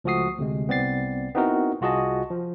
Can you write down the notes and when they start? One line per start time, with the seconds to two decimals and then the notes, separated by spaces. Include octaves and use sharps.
0.04 C#2 F3 A3 F#4 D#6 C7
0.38 D2 C3 G#3
0.68 C2 B3 C4 D5 A6 C7
1.35 B3 C4 D#4 E4 F#4 A#4
1.81 C2 F4 F#4 G#4 D#5 A5
2.30 F3